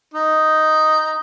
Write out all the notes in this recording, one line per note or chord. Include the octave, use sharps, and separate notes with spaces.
D#4